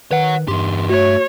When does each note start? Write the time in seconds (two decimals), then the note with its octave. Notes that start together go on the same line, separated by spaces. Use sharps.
0.11 D#3 B4 C#5 F#5
0.48 E2 G2 G4 C6
0.89 A3 F#4 C#5